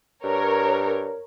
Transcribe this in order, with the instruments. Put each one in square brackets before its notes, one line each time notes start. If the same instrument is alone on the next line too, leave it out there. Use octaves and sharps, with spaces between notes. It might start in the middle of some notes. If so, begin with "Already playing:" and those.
[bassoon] G2 [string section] A#4 C#5